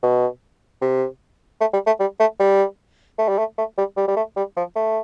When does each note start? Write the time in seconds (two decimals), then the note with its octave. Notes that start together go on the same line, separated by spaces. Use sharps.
0.03 B2
0.82 C3
1.61 A3
1.74 G3
1.87 A3
2.00 G3
2.20 A3
2.40 G3
3.19 A3
3.29 G3
3.39 A3
3.58 A3
3.78 G3
3.97 G3
4.08 G3
4.17 A3
4.37 G3
4.57 F3
4.76 A3